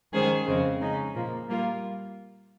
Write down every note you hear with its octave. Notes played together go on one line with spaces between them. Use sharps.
D#3 G#3 C#4 G#4 C5
F2 C#3 G#3 C4
C#3 G#3 D#4
A#2 F3 A#3
G3 A#3 F4